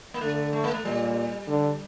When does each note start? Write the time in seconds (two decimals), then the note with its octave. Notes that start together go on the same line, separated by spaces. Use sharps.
0.14 A#3
0.21 D3 A3
0.53 A3
0.64 A#3
0.74 A3
0.85 A#2 G3
1.48 D3